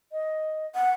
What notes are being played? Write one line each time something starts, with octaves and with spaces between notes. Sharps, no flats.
D#5
F#5